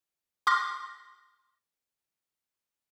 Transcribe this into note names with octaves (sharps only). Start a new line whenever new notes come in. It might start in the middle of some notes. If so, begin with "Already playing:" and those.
C6 D6 F6 A#6